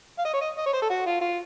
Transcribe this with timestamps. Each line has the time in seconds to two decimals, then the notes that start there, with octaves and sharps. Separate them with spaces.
0.19 F5
0.25 D#5
0.34 C#5
0.41 D#5
0.57 D#5
0.66 C#5
0.73 C5
0.82 A4
0.90 F#4
1.06 F4
1.21 F4